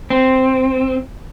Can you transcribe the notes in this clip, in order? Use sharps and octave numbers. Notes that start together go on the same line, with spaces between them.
C4